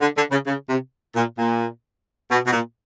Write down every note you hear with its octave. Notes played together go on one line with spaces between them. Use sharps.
D3
D3
C#3
C#3
C3
A#2
A#2
B2
B2
A#2